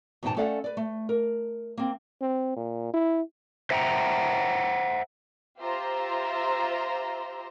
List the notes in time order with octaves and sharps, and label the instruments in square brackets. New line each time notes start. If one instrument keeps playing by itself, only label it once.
[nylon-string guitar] E2 G#2 B2 D#4 G5 A5
A3 C#4 A4 D5 F5 F#5
B4 D5
A3
A#4
A#3 C4
[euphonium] C4
A#2
E4
[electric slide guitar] C5 E5 F#5 G5 A5 A#5
[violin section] F4 G4 C5 E5 A#5 C6